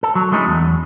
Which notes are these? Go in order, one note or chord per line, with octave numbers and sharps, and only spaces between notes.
A4
F#3
G#3 A3 C#4 D#4 E4
E2